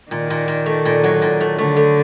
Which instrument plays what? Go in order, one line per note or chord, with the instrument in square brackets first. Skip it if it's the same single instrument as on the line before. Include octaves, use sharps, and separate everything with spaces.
[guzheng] A#2 [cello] D#3
[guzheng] A#2
A#2
A3
A#2
F#3
A#2
A3
[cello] D3 [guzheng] A3
[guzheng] A3